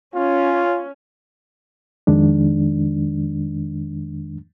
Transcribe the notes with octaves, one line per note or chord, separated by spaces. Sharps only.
C#4 F4
F2 D#3 G#3 D4